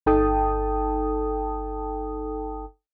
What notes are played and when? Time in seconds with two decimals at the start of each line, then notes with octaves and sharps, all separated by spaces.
0.06 G1 D#4 A4 G5 A5 D#6